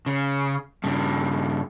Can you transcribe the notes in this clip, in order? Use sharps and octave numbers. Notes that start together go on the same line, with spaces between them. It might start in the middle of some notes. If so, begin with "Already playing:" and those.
C#3
G2 C#3